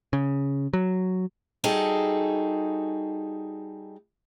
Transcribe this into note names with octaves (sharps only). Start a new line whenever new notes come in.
C#3
F#3
G3 D#4 F#4 G#4 A4